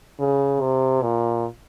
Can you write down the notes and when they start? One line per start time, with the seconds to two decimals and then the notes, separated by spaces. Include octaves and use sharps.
0.20 C#3
0.61 C3
1.02 A#2